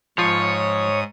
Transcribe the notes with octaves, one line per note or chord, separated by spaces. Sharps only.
G#2 F3 F4 C#5 D#6